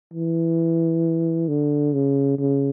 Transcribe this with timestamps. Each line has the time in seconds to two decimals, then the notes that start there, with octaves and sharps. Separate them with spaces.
0.13 E3
1.48 D3
1.93 C#3
2.38 C#3